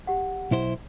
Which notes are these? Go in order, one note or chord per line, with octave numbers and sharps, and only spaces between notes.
G4 F#5
B1 E4 C5